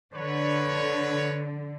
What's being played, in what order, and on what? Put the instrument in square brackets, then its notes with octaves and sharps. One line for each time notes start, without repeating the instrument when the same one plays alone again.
[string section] D3 [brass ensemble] B4 C#5